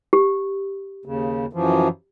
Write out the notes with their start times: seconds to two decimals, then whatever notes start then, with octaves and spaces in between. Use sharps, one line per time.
0.13 G4
1.05 D#2 C#3
1.53 F#2 E3 F3